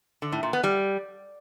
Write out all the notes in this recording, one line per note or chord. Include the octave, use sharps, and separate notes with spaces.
D3
A2
A#2
B3
G3